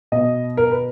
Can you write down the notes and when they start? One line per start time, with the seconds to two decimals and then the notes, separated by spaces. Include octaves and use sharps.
0.12 B2 D#5
0.57 A#4
0.71 B4